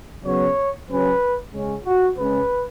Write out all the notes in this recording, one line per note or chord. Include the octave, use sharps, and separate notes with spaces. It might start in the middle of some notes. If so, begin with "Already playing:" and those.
C#3 F#3 B3 C#5
C#3 F#3 C#4 B4
C#3 G#3 C#4
F#4
C#3 G#3 C#4 B4